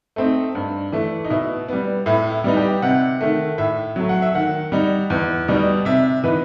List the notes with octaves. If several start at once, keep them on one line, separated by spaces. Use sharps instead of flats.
A3 C4 D#4
G2
E3 A3
D#4
B2 E4
G3 B3
A2 E4
E4
G3 B3 D#4
G4
C3 F#5
D#3 A3
A2 E5
F#3 A3
F#5
E5
D#3 F#5
G3 D#4
E2
B2 G3 D#4
C3 E5
E3 B3 D#4 B4